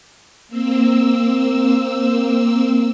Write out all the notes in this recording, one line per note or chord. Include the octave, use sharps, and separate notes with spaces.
A#3 C4 E6